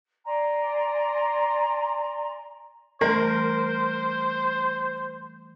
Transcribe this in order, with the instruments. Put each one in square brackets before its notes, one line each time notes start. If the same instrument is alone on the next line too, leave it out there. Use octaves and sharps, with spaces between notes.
[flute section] D5 G#5 A#5 C6
[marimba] E3 G3 A3 [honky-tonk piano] A#4 [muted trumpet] C5